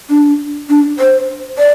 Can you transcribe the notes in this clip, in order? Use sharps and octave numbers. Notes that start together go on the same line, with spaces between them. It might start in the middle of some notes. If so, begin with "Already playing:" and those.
D4
D4
C5
D5